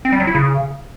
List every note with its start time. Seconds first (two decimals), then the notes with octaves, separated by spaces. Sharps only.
0.05 C4
0.12 G3
0.20 F#3
0.27 E4
0.35 C#3